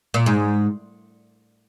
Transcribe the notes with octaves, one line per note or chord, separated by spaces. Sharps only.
A#2
G#2